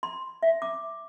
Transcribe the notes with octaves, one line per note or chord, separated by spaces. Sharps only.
C6
E5
D6